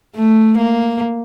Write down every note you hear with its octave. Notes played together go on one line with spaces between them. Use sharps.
A3
A#3